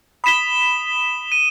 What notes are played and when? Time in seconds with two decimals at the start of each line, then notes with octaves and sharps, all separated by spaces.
0.24 B5 D#6 B6 E7 G7
1.32 D#7